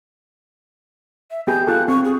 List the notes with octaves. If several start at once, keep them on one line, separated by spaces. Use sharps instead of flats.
E5
B3 G4 G#4 G6
F4 A4 F#6
C4 C#6
G#4